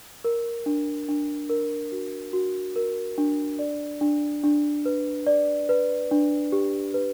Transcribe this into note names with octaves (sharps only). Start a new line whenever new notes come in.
A#4
D4
D4
A#4
F#4
F#4
A#4
D4
D5
D4
D4
B4
D5
B4
D4
G4
B4